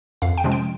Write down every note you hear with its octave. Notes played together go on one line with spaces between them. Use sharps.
F2 F5
G5
C3 F3 G#3 C#4
G5